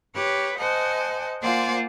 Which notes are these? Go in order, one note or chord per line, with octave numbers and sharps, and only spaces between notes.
G4 B4 C#5
C5 D#5 F#5 G#5 A5
A#3 F4 C5 D5 F#5 G#5